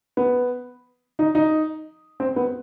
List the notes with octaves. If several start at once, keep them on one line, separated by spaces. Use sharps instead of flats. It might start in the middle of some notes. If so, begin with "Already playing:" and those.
B3
D#4
D#4
C4
B3